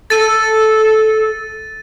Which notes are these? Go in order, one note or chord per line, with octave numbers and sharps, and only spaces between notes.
A4 A6 D#7